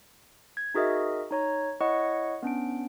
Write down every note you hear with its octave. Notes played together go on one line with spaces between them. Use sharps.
G#6
D#4 F#4 G#4 A#4 D#5 E5
D#4 C#5 A#5
E4 C#5 D#5 F#5 C#6
B3 C#4 D4 D7